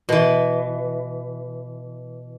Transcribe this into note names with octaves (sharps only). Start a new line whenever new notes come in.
B2 E3